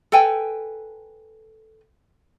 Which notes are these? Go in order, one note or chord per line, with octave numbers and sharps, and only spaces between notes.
A4 B4 G5 G#5